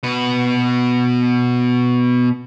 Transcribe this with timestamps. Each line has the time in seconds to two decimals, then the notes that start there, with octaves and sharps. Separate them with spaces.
0.03 B2 B4